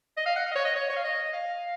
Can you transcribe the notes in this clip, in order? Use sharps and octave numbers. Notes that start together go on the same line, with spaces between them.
D#5
F5
F#5
F5
D#5
C#5
D#5
C#5
C#5
F5
D#5
F5